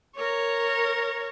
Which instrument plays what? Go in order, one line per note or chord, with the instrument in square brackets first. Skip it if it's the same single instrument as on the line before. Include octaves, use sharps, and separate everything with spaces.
[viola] A#4 C#5